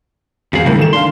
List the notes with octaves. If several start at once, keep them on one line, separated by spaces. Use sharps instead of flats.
G#1 E2 G#4 F5
A2 C#3 E3 G3 A#4
D#3 A3 E7
D4 F5 C6